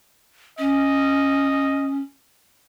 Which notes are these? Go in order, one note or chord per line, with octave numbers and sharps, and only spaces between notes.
C#4 D#5